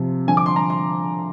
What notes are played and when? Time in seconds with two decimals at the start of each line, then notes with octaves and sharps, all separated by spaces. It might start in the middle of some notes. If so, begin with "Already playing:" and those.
Already playing: C3 F3
0.27 D3 F3 G#5
0.37 D6
0.46 C6
0.56 A#5
0.70 C6